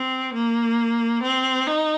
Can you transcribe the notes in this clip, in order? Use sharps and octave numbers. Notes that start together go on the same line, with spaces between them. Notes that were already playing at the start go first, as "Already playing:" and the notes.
Already playing: C4
A#3
C4
D#4